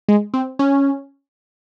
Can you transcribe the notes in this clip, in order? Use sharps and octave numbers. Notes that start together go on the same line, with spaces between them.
G#3
C4
C#4